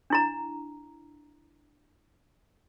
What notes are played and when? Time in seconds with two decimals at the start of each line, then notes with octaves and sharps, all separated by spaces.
0.10 D4 E4 A#5